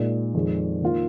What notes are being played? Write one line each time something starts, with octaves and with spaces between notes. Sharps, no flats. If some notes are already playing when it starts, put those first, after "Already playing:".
Already playing: A#2 G#3 D#4
F2 D#3 G#3
D#3 A#3 F4